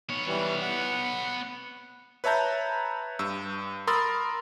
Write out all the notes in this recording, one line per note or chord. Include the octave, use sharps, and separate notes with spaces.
B3 C#5
E3 G3
F#5
B4 C#5 E5 A5 A#5 G6
G2 E6
A#4 B5 C6 D#6 E6 A6